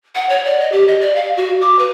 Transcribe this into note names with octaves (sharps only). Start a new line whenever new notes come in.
F#5
C#5
D5
D#5
G4
D#5
D5
F5
F#4
D6
B4